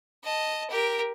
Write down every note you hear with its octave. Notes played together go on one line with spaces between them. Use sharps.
D#5 A5
G4 A#4